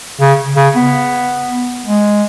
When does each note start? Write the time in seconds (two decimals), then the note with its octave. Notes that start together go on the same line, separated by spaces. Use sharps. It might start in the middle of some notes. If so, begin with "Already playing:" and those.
0.21 C#3
0.56 C#3
0.75 B3
1.86 G#3